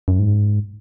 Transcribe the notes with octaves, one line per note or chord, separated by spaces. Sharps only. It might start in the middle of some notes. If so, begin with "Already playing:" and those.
F#2
G#2